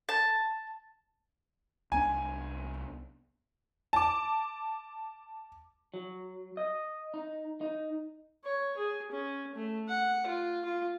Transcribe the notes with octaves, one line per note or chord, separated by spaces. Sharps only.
A5
C2 B3 D4 G#5
A5 D6
F#3
D#5
D#4
D#4
C#5
G#4
C#4
A3
F#5
F4
F4